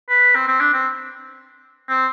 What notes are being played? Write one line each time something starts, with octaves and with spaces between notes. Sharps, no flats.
B4
C4
C4
D4
C4
C4